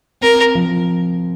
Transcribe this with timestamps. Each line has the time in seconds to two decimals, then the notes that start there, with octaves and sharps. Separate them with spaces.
0.21 C4 A#4
0.55 F3